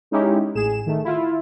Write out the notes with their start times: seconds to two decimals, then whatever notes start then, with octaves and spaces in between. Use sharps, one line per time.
0.11 G#3 C#4 D#4 E4 G4
0.55 A1 G#4 E7
0.86 D#3 A3
1.04 E4 F4